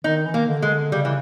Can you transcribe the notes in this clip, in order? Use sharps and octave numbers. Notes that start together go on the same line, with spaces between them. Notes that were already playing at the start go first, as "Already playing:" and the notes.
D#3 D#4
E3
D#3 A#3
D3
G#3
C#3 G3
E3